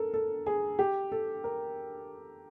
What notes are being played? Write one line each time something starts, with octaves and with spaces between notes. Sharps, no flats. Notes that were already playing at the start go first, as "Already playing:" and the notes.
Already playing: A4 A#4
A4
G#4
G4
A4
A#4